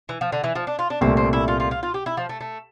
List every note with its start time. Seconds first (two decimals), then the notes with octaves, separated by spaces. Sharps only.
0.09 E3
0.21 F3
0.32 D3
0.44 E3
0.55 F3
0.67 D4
0.79 F4
0.90 D4
1.01 C2 A#2 A3 C4
1.17 C4
1.33 E4
1.48 F4
1.60 F4
1.71 F4
1.83 F4
1.94 G4
2.06 E4
2.17 F3
2.29 A3
2.41 A3